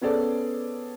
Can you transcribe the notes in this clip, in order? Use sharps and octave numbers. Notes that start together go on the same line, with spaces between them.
B3 C#4 G#4 A4 C5 D5